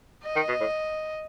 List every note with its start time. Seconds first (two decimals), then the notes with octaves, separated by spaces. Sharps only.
0.24 D#5
0.36 D#3
0.48 B2
0.60 A2